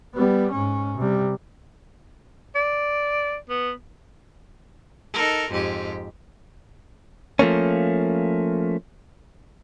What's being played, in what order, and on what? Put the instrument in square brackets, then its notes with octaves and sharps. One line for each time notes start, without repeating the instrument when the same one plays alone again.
[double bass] G3 B3
G#2 C#4
C3 G3
[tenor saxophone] D5
B3
[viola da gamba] D#4 A4 A#4
F2 G#2 G4
[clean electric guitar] F3 A3 A#3 C#4